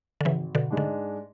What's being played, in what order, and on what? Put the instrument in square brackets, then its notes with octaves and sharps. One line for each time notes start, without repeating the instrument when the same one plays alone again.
[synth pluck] D3
[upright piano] G#1 [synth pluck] C#3 E3
[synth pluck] B2 D3
[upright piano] G#2 G#3 D4
[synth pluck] D3